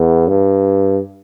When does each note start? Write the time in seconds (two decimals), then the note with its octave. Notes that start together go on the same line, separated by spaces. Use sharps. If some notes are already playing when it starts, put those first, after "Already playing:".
Already playing: E2
0.28 G2